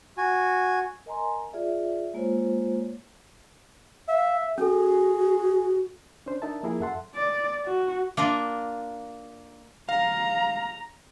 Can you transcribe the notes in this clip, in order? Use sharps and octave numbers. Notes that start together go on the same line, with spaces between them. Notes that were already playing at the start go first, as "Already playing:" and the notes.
F#4 G#5
A#4 D#5 G#5 A#5 C6
F4 G#4 D5 E5
G#3 A#3 F4 C5 C#5
E5 F5
C#4 F#4 G#4 A4
C#4 D4 C5
D4 D#4 A#4 E5 A5
F3 A#3 E4 G#4 A#4
F#2 A4 E5 F#5 A5 C6
D5
F#4
A#3 D4 F4 A#4
F5 A#5